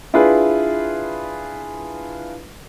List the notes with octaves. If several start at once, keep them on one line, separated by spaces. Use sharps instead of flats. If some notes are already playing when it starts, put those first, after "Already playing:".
D4 E4 F4 G#4 B4